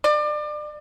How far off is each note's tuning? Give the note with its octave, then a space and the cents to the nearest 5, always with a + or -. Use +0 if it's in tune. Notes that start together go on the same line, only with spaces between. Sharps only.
D5 +30